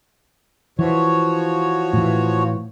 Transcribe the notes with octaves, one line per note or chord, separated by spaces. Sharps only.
E3 F3 F#4 C#5
A2 E3